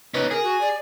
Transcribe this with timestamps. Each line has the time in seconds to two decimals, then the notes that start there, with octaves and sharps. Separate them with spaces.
0.14 C#4 D#4 B4
0.31 G#4 A#4
0.44 F#4
0.61 D5